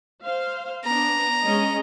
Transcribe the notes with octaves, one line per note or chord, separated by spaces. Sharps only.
C5 F5
B3 D4 A#5
G#3 C#4 D#5